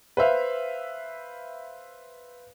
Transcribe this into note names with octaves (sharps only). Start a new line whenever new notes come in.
B4 C5 E5 F5